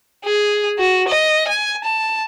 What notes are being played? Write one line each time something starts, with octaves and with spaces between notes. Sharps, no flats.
G#4
F#4
D#5
G#5
A5